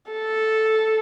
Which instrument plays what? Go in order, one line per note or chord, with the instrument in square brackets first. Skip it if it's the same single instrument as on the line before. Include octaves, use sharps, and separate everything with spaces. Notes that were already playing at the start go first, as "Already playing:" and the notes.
[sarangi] A4